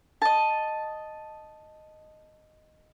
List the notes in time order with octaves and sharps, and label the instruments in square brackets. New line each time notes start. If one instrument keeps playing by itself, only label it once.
[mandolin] D#5 A5